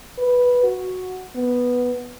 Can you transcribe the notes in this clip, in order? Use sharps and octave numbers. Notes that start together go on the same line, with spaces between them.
B4
F#4
B3